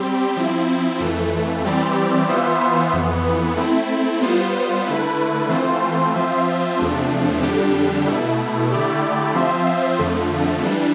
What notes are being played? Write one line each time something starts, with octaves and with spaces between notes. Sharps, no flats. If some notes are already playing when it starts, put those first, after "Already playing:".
Already playing: G3 C4 G4
F3 C4 E4
F2 E3 A3
E3 G3 C4 G4 D5
E3 B3 F4 C5 E5
F2 E3 B3
A3 C4 E4
G3 B3 F4 C5
D3 A3 E4 B4
E3 A3 C4 F4 C5
F3 C4 F4 C5 E5
E2 C3 F3 A3 D4
F2 D3 G3 D4 G4
B2 A3 E4
D3 A3 E4 G4 D5
F3 C4 F4 C5 E5
F2 D3 F3 A3
E3 G3 D4